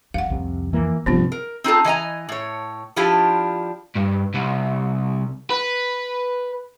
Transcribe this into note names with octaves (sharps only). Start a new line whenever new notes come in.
F2 F5 F#5
C2 C3
E3 A#3
G2 C3 F3 B3 C4 F4
A#4
C4 D#4 F4 A4
E3 D#5 G#5 A#5
A2 C#5
F3 D4 E4 F4 G4
G2
C2
B4